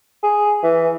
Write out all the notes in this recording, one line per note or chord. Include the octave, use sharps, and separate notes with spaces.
G#4
E3